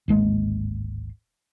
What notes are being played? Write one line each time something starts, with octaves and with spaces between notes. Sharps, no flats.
D1 G#1 G#3 A#3